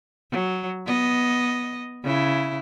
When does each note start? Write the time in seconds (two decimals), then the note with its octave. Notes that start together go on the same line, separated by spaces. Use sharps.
0.31 F#3
0.86 B3 D#5
2.03 C#3 E4